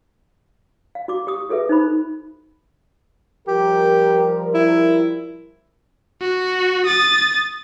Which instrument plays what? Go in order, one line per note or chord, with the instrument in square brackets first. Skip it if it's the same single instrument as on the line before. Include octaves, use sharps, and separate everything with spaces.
[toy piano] F5
F#4 D6
G4 D#6
F#4 G#4 A4 B4 E5
D#4 C5 B5
[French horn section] F3 G3 A#4 [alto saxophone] G4
[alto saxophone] E4
[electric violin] F#4
D#6 A6